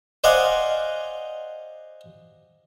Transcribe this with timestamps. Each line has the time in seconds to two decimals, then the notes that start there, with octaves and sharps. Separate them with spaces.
0.24 C5 D5 D#5 F5 F#5 G#5